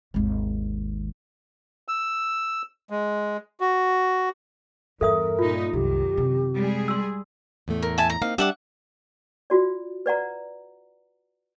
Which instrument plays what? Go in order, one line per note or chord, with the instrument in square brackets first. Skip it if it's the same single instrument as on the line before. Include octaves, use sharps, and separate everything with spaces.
[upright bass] G#1 D#2
[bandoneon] E6
G#3
F#4
[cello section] E2 [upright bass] G2 [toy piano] A4 E5 D#6 [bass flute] A#4
[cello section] A#2 D#4 [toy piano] F4
[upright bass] C2 [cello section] F#2 D#3 [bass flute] G4
[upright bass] C3
[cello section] G3 G#3 G#4
[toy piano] C6 E6
[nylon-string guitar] E2 A2 A3
[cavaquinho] A#4
E5 G#5 A5
A#5
[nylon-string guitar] A#3 C4 D#4 [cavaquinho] F5
[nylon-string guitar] G3 D4 G4 [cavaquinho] E5 F#5 D6
[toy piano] F4 F#4 D5
B4 D5 F#5 A#5